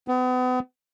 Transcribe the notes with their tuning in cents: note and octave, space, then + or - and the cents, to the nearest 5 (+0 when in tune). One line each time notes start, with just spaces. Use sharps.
B3 +40